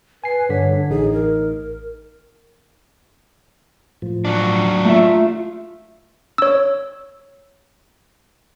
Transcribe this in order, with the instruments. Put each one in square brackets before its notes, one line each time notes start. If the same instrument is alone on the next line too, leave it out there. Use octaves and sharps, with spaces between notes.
[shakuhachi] B4 [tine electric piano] G#5 C7
[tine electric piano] G2 D3 B6 [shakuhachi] C#5
[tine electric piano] D3
[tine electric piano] A1 D#4 [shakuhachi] G#4
[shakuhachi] A#4
[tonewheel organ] A2 F3
[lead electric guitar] F#3 D4
[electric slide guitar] A3 E5 [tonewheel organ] F4
[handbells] C#5 E6